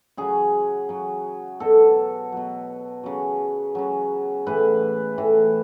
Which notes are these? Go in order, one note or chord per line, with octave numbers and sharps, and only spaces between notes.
C#3 F#3 G#4
C#3 F#3
B2 F#3 A4
B2 F#3
C#3 F#3
C#3 F#3
A2 E3 B4
A2 E3